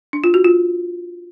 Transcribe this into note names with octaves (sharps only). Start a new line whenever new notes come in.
D4
F4
F#4
F4